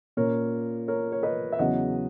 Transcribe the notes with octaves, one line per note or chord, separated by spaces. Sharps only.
A#2 A#3 C#4 A#4 C#5
A#4 C#5
C#5
B4 D#5
E5
E2 C#3 F#3 B3 D#5 F#5